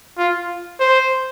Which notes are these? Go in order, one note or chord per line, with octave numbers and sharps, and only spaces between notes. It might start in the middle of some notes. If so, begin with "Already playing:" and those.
F4
C5